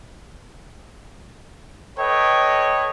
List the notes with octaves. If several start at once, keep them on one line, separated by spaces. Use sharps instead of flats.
A4 B4 C#5 D#5 G5